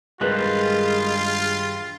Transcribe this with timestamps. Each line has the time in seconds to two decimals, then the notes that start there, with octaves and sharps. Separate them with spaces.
0.21 G2 D#3 G3 G#3 F4 A#4 B4 F#6